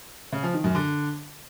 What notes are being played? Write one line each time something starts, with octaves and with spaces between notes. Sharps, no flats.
C#3
F3
D#3
F#2
D3